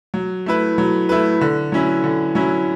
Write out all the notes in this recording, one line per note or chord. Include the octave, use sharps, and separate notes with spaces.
F#3
A3 E4 B4
F#3
A3 E4 B4
D3
F#3 C#4 E4
D3
F#3 C#4 E4